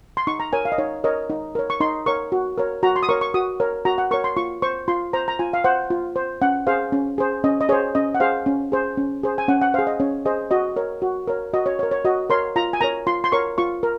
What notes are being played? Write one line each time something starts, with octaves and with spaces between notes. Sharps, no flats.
C6
D#4 C#6
A#5
A#4 C#5 G#5
F5
D#5
D#4 C#5
A#4 C#5 D#5
D#4
A#4 C#5
C#6
D#4 C6
A#4 C#5 C#6
F#4
A#4 C#5
F#4 A#5
C6
D#6
A#4 C#5 C#6
C#6
F#4 D#6
A#4 C#5
F#4 A#5
F#5
A#4 C#5 C#6
C6
F4 C#6
C5 C#6
F4 C6
C5 A#5
A#5
F4 G#5
F5
C5 F#5
F4
C5
C#4 F#5
G#4 C5 F5
C#4
G#4 C5
C#4 D#5
D#5
G#4 C5 C#5
C#4 D#5
F#5
G#4 C5 F5
C#4
G#4 C5
C#4
G#4 C5
G#5
C#4 F#5
F#5
G#4 C5 F5
D#5
C#4 C#5
G#4 C5 D#5
F#4 D#5
A#4 C#5
F#4
A#4 C#5
F#4 D#5
C#5
C#5
A#4
C#5
F#4 D#5
A#4 C#5 C6
F4 A#5
G#5
A#4 C#5 A#5
F4 C6
C6
A#4 C#5 C#6
F4 C#6
A#4